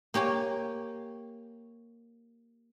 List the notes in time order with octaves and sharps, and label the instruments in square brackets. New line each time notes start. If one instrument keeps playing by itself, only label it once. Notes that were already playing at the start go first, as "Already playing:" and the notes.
[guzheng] A#3 G4 C#5 G#5